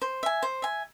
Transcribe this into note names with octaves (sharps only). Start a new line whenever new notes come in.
C5
E5 G#5
C5
E5 G#5